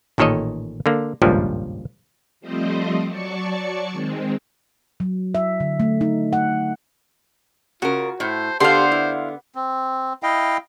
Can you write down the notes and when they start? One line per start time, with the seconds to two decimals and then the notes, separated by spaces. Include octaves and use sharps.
0.18 A1 A#2 D#3 A4 C#5 D#5
0.86 D3 A#3
1.22 G#1 C#2 G2 A#2 F3 G3
2.40 F3 G3 A3 C4 C5 D#5
3.07 F#3 D5 A5 C#6 C#7
3.91 D#3 G#3 C4
5.00 F#3
5.35 E5
5.60 D3
5.80 A3
6.01 D#4
6.33 F#5
7.82 C#3 F4 F#4 A#4
8.20 A2 C5
8.60 D3 B3 G4 A4 C5 F5 C6
8.92 E4
9.55 C4
10.23 E4 D#5 F5 G5